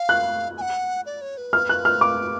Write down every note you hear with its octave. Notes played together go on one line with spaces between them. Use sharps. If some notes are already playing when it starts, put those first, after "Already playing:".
Already playing: F5
F#6
G#5
F#5
D5
C#5
B4
F6
F#6
F6
D6